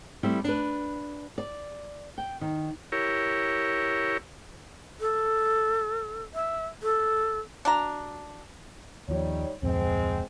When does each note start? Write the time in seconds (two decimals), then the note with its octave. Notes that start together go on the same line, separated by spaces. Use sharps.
0.23 G3 A3 C4 E4
0.44 D4 B4
1.38 D5
2.18 G5
2.41 D#3
2.92 E4 G4 A#4 C#5
5.00 A4
6.34 E5
6.83 A4
7.65 D4 F#4 A#5
9.09 D#2 F3 G3 D#4 C#5
9.63 D1 F2 G#3 C4